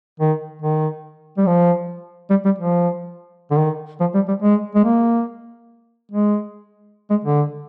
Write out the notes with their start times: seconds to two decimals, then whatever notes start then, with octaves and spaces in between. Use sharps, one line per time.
0.19 D#3
0.61 D#3
1.38 G3
1.46 F3
2.30 G3
2.45 G3
2.58 F3
3.51 D3
3.57 D#3
4.00 F3
4.14 G3
4.28 G3
4.42 G#3
4.75 G#3
4.85 A#3
6.11 G#3
7.10 G#3
7.24 D3